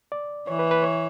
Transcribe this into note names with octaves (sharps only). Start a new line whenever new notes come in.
D5
E3 C#5
B4
B4
C#5